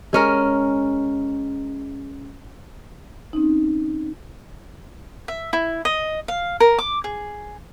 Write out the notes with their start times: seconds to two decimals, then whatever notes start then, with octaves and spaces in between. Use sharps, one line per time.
0.13 G#3 C#4 A#4
3.33 C4 C#4 D#4
5.28 E5
5.53 E4
5.85 D#5
6.28 F5
6.60 A#4
6.79 D6
7.04 G#4